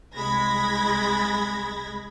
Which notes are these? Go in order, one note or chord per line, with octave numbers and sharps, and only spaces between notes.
C2 G#3 B5 G#6 A#6